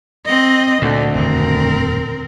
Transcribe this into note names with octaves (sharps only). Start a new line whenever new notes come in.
C4 D#5
D2 A#2 D3
D#1 F2 A2 C4 A#4